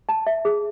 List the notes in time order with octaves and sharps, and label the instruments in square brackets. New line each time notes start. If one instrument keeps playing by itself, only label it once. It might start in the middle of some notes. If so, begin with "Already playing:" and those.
[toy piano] A5
E5
G#4